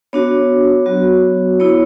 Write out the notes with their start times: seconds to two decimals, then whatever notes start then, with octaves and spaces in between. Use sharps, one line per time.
0.13 B3 D4 F#4 C#5
0.86 F#3 B3 F#4
1.60 B3 E4 C#5